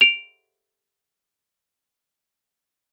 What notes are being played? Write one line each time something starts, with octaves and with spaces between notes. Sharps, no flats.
D7 F7